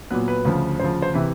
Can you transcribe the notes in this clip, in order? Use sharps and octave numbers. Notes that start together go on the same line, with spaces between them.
A#2 F#3 B3 B4
B4
D2 C#3 F3
D2 C#3 F3 C5
C5
C3 E3 B4